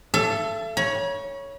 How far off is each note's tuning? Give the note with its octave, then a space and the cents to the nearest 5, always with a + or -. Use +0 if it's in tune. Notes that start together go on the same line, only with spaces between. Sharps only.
A4 +0 E5 +40
C#5 +5 B5 -45